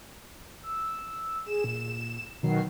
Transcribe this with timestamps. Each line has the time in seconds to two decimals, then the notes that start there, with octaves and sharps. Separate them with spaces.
0.63 E6
1.46 G#4 E7
1.64 A#2
2.43 B2 D#3 F#3 C7